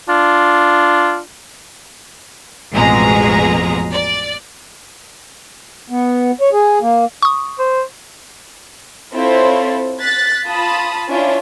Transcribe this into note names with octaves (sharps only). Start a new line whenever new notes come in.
D4 F4
A1 F2 B2 G#3 G#4 A#5
D5
B3
C#5
G#4
A#3
C#6 D#6
C5
C4 E4 F4 A4 C5 C#5
F#6 A6 B6
F4 A5 B5 D#6
C#4 D4 E4 F4